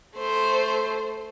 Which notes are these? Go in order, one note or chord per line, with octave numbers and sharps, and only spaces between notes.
A3 C5